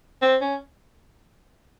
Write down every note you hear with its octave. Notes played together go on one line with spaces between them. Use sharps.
C4
C#4